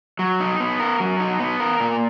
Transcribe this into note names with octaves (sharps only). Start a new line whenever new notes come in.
F#3
D#4
B3
A#4
F#3
D#4
B3
A#4
A#2